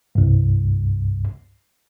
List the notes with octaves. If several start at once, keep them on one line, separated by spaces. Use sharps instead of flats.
C2 G2